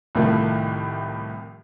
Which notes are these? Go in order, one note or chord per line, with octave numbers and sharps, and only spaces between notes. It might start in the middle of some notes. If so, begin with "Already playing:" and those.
C2 A2 D#3 F3 A3